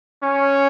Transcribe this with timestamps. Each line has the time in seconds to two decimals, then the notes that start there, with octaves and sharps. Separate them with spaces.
0.23 C#4